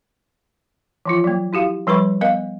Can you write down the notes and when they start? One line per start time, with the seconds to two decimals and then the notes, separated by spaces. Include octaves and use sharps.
1.05 E3 F3 F4
1.24 F#3 A#3
1.53 E4 F#4 G4 F5
1.87 F3 G3 B4 B5 C#6
2.21 B3 A#4 D#5 F5